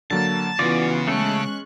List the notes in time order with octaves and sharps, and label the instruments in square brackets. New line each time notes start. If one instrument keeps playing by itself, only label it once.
[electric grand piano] D3 F#3 A#3 [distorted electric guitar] A5
[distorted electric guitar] C#3 [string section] E3 B3 F#4 [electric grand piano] F4 A6 [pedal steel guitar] D5
[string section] G#3 C#6 F#6 [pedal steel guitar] A3 A4 [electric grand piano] C#4